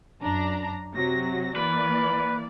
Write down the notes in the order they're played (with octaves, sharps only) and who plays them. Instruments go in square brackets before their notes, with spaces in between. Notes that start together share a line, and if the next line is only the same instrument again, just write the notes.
[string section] F#2 D4 A#5
C3 F#3 A#6
[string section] E3 A#3 D5 [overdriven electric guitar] B4